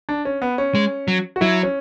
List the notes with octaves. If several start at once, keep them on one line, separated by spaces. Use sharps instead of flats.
D4
C#4
B3
C#4
G#3
F#3
F#4
F#3 E4
C#4